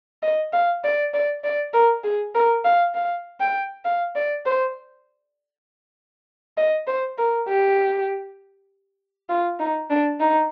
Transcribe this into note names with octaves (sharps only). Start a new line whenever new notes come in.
D#5
F5
D5
D5
D5
A#4
G#4
A#4
F5
F5
G5
F5
D5
C5
D#5
C5
A#4
G4
F4
D#4
D4
D#4